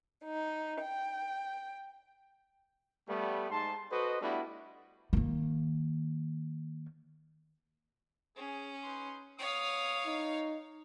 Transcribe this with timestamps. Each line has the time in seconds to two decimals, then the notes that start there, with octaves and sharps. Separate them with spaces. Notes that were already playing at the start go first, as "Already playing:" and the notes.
0.24 D#4
0.82 G5
3.09 G3 A3 B3
3.51 G#2 A5 C6
3.91 F#4 A4 B4 C5 D#5
4.21 G3 A3 B3 D4 E4 F#4
5.13 D#3 A#3
8.36 C#4 G#4
8.83 D#4 B4 C6
9.39 B3 C#5 F5 D#6
10.06 D#4